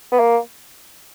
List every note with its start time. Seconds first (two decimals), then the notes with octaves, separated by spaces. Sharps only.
0.12 B3
0.20 A#3